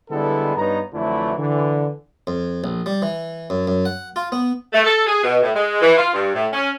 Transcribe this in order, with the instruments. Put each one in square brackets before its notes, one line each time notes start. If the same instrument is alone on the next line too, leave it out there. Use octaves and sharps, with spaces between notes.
[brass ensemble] D3 G3 G#3 B3 E4 A4
G2 B3 D#4 C#5 A#5
F2 D3 E3 F#3 A3 E4
D3 E3
[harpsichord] F2
A#1
G3
E3
F#2
F#2
F#5
F4
B3
[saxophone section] A3
A4
G#4
B2
A2
G#3
E3
F4
G2
A2
C#4